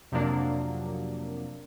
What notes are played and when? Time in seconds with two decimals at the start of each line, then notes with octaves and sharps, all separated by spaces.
0.12 F2 C3 F3 F#3 A#3 D4